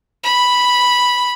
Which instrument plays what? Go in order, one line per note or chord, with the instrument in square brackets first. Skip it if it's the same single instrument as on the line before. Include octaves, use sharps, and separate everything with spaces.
[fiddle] B5